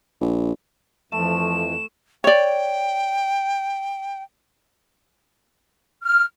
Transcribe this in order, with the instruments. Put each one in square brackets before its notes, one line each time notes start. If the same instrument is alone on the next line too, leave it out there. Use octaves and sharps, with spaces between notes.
[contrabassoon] A#1
[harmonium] F2 E3 [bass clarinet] F3 [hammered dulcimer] A3 [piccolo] E7
[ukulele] C#5 D5 [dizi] G5
[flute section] F6